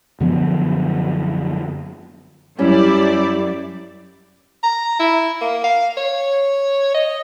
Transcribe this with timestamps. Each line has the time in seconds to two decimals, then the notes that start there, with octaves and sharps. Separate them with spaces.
0.20 F#2 D3 F3 B3
2.59 F#2 G3 C#4 E4 G4 D5
4.63 A#5
4.99 E4
5.41 A#3
5.64 F5
5.97 C#5
6.95 D#5